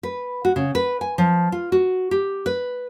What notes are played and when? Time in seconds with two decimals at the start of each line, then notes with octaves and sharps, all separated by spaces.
0.03 B4
0.45 F#4
0.56 C#3
0.75 B4
1.01 G#5
1.18 F3
1.52 F4
1.72 F#4
2.11 G4
2.46 B4